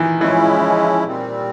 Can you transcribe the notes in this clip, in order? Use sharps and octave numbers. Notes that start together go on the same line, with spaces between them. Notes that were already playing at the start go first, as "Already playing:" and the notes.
Already playing: D#3 E3
E3 F3 G#3 C#4 E4
A#2 G3 C4